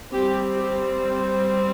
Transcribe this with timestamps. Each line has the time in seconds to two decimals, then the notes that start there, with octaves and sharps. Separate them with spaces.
0.12 G3 C4 G4
0.58 G4